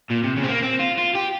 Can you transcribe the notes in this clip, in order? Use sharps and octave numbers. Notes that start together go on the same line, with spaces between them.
A#2
C3
C#3
C4
A#3
C4
F4
F4
G4